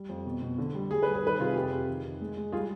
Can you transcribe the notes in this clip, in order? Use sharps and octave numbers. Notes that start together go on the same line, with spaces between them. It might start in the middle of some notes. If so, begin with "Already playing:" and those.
Already playing: G3
F2
B2
B2
D3
G3
G3 G#4
G3 B4
G#4
D#3 B4
C3 F4 G#4
F2 G4
F2
D#3
D#3
G#3
G#3
G3 F4 G#4